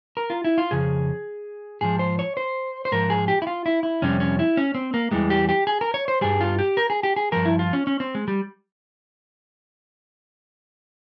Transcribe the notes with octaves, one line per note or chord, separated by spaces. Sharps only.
A#4
F4
E4
F4
F2 C#3 G#4
G#2 F3 G#4
C5
C#5
C5
C5
G#2 F3 A#4
G#4
G4
E4
F4
E4
E4
F2 C3 G3 C#4
C#4
E4
C#4
C4
A#3
E2 E3 G3 G#3
G4
G4
G#4
A#4
C#5
C5
G2 G3 G#4
F4
G4
A#4
G#4
G4
G#4
G2 F3 A#4
E4
F4
C#4
C#4
C4
G#3
G3